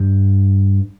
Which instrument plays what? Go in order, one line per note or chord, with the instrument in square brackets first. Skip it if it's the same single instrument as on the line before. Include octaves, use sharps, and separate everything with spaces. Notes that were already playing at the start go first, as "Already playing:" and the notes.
Already playing: [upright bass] G2